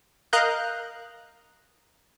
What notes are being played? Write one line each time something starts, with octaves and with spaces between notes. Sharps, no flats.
A#4 D#5 F5 A#5 F#6 G6